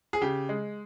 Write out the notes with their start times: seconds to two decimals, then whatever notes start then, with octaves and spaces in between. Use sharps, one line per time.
0.13 G#4
0.21 C#3 G4
0.49 G#3